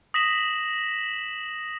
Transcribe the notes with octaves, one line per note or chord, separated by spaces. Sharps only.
D#6 A#6 B6 E7 F#7